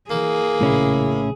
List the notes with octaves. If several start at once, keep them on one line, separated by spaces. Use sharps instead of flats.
E3 A#3 G#4
A#1 A2 C#3 E3 C#4 E4